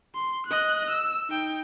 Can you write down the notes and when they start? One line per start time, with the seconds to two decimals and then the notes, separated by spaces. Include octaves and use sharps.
0.15 C6
0.46 D#5 F#6
0.90 E6
1.29 D#4 G5